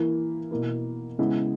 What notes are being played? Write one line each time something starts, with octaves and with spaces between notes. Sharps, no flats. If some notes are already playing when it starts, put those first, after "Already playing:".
Already playing: E3 A#3 E4
B2 A#3 E4
C#3 G#3 B3 E4